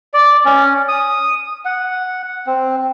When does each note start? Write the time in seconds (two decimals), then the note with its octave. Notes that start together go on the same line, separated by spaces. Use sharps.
0.14 D5
0.45 C#4
0.88 D#6
1.65 F#5
2.47 C4